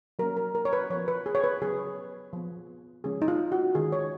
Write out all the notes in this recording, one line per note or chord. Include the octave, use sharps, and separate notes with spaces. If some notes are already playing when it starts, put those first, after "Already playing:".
F#3 A#3 C#4 A#4
A#4
A#4
C#5
B4
F3 B3 C#5
B4
G#4
C#5
B4
C#3 F#3 B3 G#4
F3 B3
C#3 F3 G#3 C#4 G#4
D#4
F4
F#4
D#3 G#3 C#4 G#4
C#5